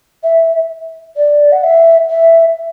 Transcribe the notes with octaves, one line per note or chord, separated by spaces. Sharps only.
E5
D5
F#5
E5
E5